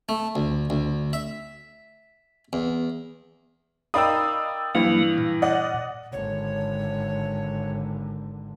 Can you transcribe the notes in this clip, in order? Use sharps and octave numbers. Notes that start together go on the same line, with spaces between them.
A3
D2
D2
E5
E2
D#4 A#4 D5 F5 G5 B5 D#6 E6
G2 E3 F#3 A#3 F5
A#2
D5 D#5 F#5
G#1 D3 C#5